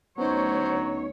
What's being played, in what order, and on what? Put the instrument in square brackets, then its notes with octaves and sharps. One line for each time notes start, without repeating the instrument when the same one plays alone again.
[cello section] D2 C#5 [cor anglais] F#3 [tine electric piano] B3 C#4 D#4 [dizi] C5